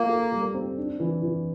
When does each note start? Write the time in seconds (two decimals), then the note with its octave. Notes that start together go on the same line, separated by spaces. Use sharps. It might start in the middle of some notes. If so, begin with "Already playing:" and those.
Already playing: A#3 F4
0.09 A4
0.32 G3
0.54 C4
0.77 D4
1.00 E3
1.22 E3